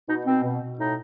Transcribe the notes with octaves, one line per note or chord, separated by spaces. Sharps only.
B2 D#4
B2 C4
B2
B2
A2 D#4